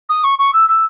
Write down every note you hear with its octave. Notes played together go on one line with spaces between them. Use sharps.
D#6
C#6
C#6
E6
E6